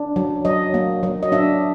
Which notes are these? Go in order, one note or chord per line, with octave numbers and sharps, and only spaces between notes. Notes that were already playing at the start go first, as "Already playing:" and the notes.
Already playing: D4
F#3
F#3 D#5
A#3
F#3
D#5
D4 E5